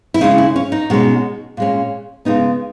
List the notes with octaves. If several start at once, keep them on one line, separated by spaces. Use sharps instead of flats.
E4
C#3 G#3 C#4 D#4
E4
C#4
D#4
B2 G#3 C#4
A#2 G#3 C#4
C#3 G#3 B3 D#4